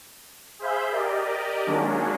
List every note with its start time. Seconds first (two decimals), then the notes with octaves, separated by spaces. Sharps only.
0.59 G#4 C5 E5 F5 B5 G6
0.91 G4 A#4 D5 D#5
1.66 D#3 F#3 G#3 A#3 C#4 D4